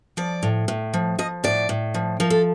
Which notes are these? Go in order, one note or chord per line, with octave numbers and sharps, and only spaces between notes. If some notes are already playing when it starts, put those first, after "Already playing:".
F3 D5
A2
A2
F3
F3 D#5
A2 D5
A2
F3
F3 A#4
A4